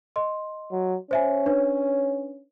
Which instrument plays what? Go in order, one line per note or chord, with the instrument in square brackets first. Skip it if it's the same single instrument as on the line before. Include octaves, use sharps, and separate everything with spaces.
[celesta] D#5 C6
[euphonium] F#3
[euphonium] C#4 [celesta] C5 E5 G#5
[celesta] D4 B4 C#5